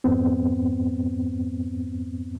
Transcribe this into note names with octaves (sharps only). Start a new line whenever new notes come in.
F2 G#2 B3 C4